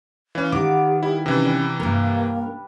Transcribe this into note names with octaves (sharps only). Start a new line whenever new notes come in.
E3 C#4 B4 D5 F5
D#3 G4 F#5 D6
G3 E4
C3 E3 C#4
G3 D4 B4
G2 A#3 A#4